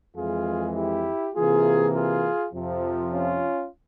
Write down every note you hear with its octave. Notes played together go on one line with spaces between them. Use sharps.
F2 E3 G#3 F4 G#4
E4 G4
C3 E3 A#3 F4 G#4
F4 G#4
F2 C3 F3
C#4 F4